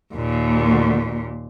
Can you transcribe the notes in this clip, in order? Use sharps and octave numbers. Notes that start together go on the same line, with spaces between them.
D#2 A#2